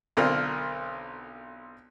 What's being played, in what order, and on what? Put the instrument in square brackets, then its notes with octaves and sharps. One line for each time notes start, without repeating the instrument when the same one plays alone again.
[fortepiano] B1 D3 C4 F4 A#4 F6